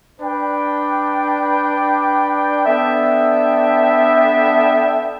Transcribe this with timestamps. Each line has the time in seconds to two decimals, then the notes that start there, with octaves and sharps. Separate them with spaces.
0.20 D4 B4 D5 G5
2.66 B3 D4 A4 E5 G5